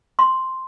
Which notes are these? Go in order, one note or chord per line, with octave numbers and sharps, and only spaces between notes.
C6